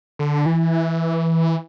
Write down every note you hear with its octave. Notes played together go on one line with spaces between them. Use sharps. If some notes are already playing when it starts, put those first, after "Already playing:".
D3
E3